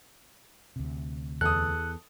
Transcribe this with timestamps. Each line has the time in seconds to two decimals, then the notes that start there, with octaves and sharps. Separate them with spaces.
0.76 D2 C3
1.41 E2 A4 D#6 F#6